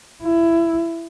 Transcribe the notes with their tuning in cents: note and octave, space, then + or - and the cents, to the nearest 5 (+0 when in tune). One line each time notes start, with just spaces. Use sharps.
E4 +20